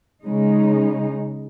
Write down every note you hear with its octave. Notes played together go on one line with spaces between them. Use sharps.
C#3 G#3 D#4